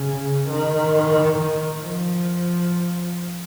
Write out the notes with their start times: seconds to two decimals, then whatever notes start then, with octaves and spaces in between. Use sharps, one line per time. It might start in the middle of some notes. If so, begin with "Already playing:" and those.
Already playing: C#3
0.49 D#3
1.39 D#3
1.84 F3